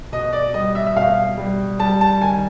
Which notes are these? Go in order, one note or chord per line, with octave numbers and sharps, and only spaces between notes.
B2 D#5
D5
G3 D#5
E5
E5
B2 F5
G3
G3 A5
A5
D#3 G#5